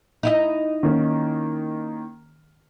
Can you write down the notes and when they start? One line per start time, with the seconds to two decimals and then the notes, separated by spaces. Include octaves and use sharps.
0.23 D#4 E4 D#5
0.83 D#3 A#3 C#4